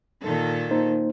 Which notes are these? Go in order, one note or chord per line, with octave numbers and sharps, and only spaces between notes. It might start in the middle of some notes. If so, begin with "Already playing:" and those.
A#2 D#3 A4
A#3 D#4 C5